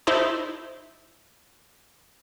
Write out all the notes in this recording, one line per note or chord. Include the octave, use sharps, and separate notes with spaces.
D#4 E4 C5 A5